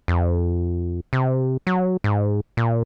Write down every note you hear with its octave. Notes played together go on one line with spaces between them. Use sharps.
F2
C3
F#3
G#2
A#2